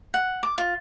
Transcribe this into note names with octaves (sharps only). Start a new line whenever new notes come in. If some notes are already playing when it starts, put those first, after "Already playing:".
F#5
D6
F4